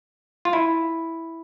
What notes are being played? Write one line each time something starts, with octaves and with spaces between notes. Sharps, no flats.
F4
E4